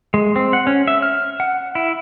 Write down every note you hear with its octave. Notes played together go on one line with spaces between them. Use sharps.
G#3
C4
F#5
C#4
E5
F6
F#5
E4